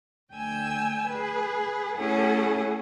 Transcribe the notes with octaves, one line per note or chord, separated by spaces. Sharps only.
D2 G5 G#5 E6
G#4 B4
A3 C#4 E4 G#4 A4 F#5